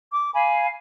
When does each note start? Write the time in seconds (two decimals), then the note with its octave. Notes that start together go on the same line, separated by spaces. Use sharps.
0.12 D6
0.34 F5 G#5 B5